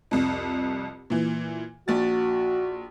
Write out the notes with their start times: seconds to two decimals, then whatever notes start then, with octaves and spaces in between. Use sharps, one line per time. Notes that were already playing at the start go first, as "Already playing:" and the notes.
0.11 C2 F2
1.10 A#2 E3
1.88 A#1 F#4 A6